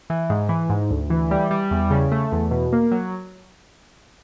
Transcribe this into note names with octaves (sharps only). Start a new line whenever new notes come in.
E3
G#2
E3
G#2
D2
E3
G3
G3
E2
C#3
A3
E2
B2
A#3
F#3